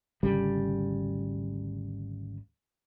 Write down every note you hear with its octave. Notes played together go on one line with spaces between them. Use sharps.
G#1 D2 C#3 G3